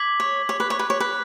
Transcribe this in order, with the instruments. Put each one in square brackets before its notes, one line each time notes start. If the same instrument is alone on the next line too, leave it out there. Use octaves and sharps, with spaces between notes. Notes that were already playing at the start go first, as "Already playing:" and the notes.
Already playing: [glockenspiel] D6 G#6 B6 F#7
[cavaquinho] C#5
C#5
B4
C#5
B4
C#5
B4